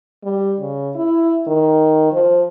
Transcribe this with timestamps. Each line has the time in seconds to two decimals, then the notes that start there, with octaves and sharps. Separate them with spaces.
0.24 G3
0.61 C#3
0.95 E4
1.47 D#3
2.12 F3